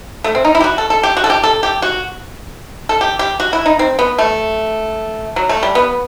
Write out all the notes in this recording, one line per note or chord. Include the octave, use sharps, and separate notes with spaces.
A3
C4
D#4
E4
G4
F#4
A4
A4
G4
F#4
A4
G4
A4
G4
F#4
A4
G4
G4
F#4
E4
D#4
C4
B3
A3
F#3
A3
G3
B3